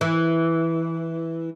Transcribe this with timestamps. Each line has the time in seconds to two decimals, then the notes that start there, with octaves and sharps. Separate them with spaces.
0.01 E3